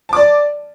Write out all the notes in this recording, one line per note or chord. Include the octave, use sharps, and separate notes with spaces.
D5 A5 D6